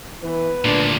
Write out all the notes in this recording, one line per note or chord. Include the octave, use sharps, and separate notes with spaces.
E3 B3 B4
D2 A#2 D4